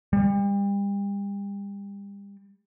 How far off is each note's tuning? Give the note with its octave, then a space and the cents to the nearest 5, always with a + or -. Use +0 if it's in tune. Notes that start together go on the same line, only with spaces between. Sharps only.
G3 +35